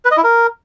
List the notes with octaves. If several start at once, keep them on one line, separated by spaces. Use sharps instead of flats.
B4
D#5
E4
A#4